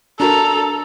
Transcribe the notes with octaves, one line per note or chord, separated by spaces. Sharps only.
D4 F#4 A4 A#4 A#5